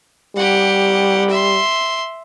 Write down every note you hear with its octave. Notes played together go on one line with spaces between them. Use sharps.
G3 G4 F#5
E5 C6